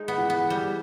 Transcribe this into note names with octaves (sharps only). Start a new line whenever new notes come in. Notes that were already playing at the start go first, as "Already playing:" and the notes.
Already playing: G#3 D#4
B3
E3
B3
G3